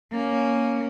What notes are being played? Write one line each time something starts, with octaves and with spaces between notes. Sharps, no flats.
A#3 C#4